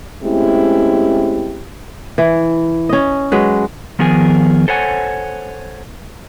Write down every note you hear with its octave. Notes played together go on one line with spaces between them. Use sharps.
G#3 A3 C4 C#4 E4 G4
E3
C#4 D#5
F#3 G#3 B4
D#3 F3 B3 G#4 A#4 G#5
A4 C5 C#5 F#5 G#5